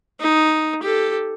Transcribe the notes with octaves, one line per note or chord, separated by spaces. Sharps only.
D#4
G4 A4